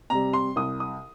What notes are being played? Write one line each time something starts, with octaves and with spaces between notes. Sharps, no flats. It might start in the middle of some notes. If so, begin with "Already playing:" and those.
C3 G3 A#5
C6
C2 D#6
D#6